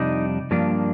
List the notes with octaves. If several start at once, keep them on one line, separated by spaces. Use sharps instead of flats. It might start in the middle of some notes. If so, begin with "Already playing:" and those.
Already playing: F2 C3 G3 D4 D#4
G2 F3 A#3 D4